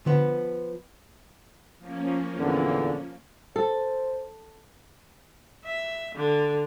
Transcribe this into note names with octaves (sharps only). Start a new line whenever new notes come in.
D3 F3 B3
F3 A#3 C#4
E2 A#2 D3
A4 C5
E5
D3